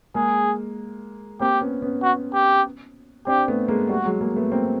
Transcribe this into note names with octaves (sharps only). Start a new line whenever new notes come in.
G#3 A#3 G#4
A#3 C4 G4
B3 C#4
B3 C#4
F#4
G4
C4 D4 G4
A3 B3
G#3 A#3
G3 A3 F#4
F#3 G#3
G#3 A#3
A3 B3
A#3 C4